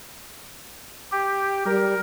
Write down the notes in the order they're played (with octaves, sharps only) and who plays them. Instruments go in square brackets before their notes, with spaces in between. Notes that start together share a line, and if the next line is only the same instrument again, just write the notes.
[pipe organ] G4
[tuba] G3 [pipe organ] A#4